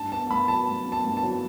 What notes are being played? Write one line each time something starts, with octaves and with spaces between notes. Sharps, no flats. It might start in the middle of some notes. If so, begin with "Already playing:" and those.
Already playing: G2 A5
B3 A5
G2 B5
F#3 A5
G2
B3
A5
G2
A5
F#3